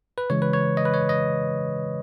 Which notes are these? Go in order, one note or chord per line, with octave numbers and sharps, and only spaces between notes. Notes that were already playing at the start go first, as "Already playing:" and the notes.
B4
C#3 E3 G#3 C#5
B4
C#5
D#5
B4
C#5
D#5